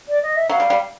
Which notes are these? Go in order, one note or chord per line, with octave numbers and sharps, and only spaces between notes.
D5
D#5
E5
F#3 F5
G3
G3